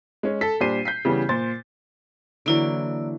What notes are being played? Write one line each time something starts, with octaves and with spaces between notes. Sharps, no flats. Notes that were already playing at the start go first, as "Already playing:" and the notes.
G#3 C#4
A4 B6
A#2 G3 D4 C5 C7 D#7
G6 B6 C7
C#3 E3 G3 B3 C#4
A#2 C5 C6 A6
D3 E3 F#3 A#3 E4 D5